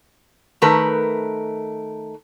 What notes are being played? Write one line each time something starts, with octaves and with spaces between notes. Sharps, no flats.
D#3 A3 A#4 B4